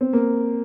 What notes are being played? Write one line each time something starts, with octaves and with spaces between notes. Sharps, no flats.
C4
A#3